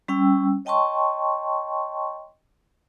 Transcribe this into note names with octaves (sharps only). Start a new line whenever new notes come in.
G3 C#4 G5 E6
C#5 D#5 G5 A5 C6 C#6